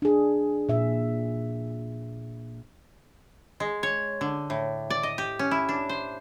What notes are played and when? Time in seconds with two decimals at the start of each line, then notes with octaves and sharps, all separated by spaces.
0.02 D4 G#4
0.69 A#2 E5
3.60 G#3
3.83 C#5
4.21 D3
4.50 A2
4.90 D5
5.03 D#5
5.18 G4
5.39 C#4
5.51 E4
5.69 D4
5.89 C5